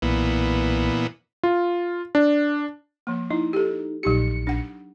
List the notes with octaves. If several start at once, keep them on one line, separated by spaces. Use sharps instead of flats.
B1 A#2 E3 B3
F4
D4
F3 A#3
D#4 E4
G4 A4
A#1 F#3 D#4 G4 C#7
D4 F#5